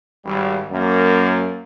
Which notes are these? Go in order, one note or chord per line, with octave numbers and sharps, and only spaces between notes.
G#1 G3
F#2 A#3